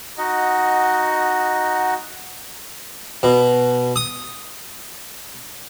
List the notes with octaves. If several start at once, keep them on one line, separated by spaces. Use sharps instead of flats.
D#4 F#4 D#5 F#5
B2
D#6